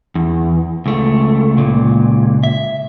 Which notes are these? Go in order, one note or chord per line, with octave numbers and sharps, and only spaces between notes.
E2
C#2 A3
C#2 A#2
E5